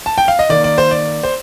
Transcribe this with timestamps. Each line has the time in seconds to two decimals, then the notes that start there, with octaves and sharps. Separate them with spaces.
0.06 A5
0.18 G5
0.28 F5
0.39 D#5
0.49 D#3 A#3 D5
0.64 D5
0.78 C5
0.91 D5
1.23 C5